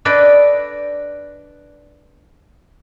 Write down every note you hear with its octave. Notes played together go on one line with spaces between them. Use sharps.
D4 A4 B4 D5 D#5 G5